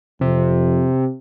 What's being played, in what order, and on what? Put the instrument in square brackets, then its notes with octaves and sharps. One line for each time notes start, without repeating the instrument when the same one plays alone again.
[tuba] F2 [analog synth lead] C3